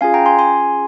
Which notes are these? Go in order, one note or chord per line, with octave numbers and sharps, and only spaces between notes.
C#4 F4 G#4 F5 G#5
G5 A#5
G#5 C6
G#5 C6